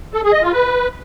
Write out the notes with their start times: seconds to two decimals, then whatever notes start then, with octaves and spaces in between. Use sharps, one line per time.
0.13 A4
0.23 G#4
0.33 D#5
0.42 F4
0.52 B4